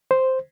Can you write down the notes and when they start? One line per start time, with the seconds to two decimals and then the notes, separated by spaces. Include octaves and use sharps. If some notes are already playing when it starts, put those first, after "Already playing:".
0.11 C5